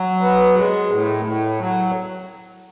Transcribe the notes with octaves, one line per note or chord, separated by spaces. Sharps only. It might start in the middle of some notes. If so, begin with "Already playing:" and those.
Already playing: F#3
B3
G#3
A2
A2
F#3